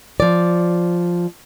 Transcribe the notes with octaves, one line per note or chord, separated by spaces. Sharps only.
F3 D5